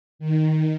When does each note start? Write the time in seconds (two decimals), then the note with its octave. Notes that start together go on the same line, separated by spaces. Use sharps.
0.19 D#3